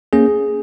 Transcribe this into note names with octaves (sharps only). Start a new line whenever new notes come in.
A#3 C#4 G#4